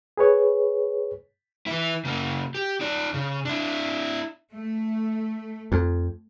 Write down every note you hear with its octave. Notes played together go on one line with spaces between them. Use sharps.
G#4 B4 C#5
E3 E4
C#3 A#3
G4
D#4 D5
C#3
D4 E4
A3
F2